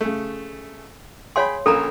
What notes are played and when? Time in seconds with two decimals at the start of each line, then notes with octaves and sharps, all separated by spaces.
0.01 C#3 A3
1.36 G#4 C#5 F5 G5 B5 C6
1.66 A#1 C#4 A4 A#4 A#5